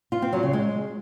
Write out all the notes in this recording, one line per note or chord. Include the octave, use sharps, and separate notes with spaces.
F4
C4
F#3
C#3
G#3